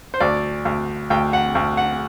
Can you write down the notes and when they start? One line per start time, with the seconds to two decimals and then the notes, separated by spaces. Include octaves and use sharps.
0.14 C5
0.20 D2 D5
0.65 D2
1.10 D2 G5
1.33 F#5
1.55 D2
1.77 F#5